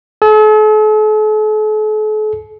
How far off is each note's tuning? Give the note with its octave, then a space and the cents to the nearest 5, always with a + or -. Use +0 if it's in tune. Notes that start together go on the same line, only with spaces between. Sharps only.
A4 -45